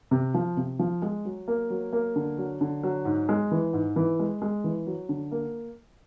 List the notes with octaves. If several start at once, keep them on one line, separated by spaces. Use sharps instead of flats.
C3
F3
C3
F3
G#3
F#3
A#3
F#3
A#3
D3
F#3
D3
F#3
G#2
G#3
E3
G#2
E3
G#3
G#3
E3
F#3
D3
A#3